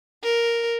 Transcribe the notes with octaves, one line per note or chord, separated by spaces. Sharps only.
A#4